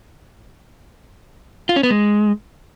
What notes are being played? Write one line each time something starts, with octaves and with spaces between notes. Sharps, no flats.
F4
C#4
B3
G#3